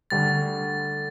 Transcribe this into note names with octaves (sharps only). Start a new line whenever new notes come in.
D2 D3 G3 A6